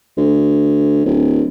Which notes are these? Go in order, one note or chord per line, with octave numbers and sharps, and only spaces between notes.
D2
D1